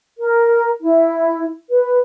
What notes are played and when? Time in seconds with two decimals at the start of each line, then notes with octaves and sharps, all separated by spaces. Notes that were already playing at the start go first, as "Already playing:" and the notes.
0.18 A#4
0.82 E4
1.70 B4